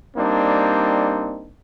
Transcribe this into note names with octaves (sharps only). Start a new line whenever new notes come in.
G3 A#3 C4 D4 D#4